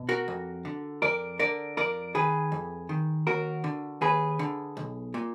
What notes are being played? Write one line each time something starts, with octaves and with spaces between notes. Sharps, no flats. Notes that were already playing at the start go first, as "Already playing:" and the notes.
Already playing: B2
F#4 A#4
F2
D3
F2 A#4 D5
D3 A#4 D5
F2 A#4 D5
D#3 G#4 B4
F2
D#3
D#2 F#4 A#4
D3
D#2 G#4 B4
D3
B1
A#2